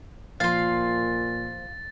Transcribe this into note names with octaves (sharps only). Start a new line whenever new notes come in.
A#2 F3 A#3 F4 F5 A6